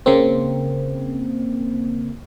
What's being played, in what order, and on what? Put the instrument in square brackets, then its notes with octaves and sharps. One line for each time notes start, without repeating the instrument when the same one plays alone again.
[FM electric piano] C#3 A#3 C4